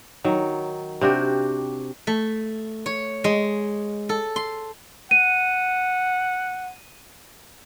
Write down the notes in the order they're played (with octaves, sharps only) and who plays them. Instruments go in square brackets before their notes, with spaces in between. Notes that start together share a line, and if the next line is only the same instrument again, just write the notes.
[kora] D#3 F#3
C3 D4 F#4 G4
[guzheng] A3
C#5
G#3
A4
C6
[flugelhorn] F#5 [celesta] D#7